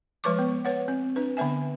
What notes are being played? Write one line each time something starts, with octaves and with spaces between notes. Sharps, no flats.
F3 G#3 B4 C#5 C#6 D6
B3
B4 C#5 F#5
C4
D4 B4
D3 B3 B4 E5 G#5